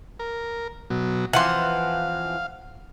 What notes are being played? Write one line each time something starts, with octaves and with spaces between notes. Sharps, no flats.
A#4
B2 F#3
E3 F3 C4 F5 F#5 C6